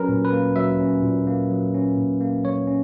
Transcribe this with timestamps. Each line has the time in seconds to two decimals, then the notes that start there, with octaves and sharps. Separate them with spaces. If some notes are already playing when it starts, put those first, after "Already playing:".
Already playing: F#3 C#4 A#4 B4
0.09 A#2
0.25 B4
0.32 A#3
0.56 F#3 E5
0.80 C#4
1.03 A#2
1.27 A#3
1.51 F#3
1.74 C#4
1.97 A#2
2.21 A#3
2.44 F#3 C#5
2.67 C#4